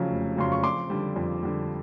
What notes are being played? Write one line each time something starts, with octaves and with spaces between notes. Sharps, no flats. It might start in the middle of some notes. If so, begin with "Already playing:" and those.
Already playing: F1 F2 C#3 F#3
F1
F2 C#3 F#3 C6
C#6
F2 C6 D6
D3 G3
F2
D3 G3